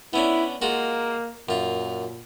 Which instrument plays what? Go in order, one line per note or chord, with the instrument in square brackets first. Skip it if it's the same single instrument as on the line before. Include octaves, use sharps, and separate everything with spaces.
[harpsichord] B3 C#4 D4 [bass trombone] E4
[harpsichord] G#3 F4 F#4 [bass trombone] A#3
[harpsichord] F#2 F4 [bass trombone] A#2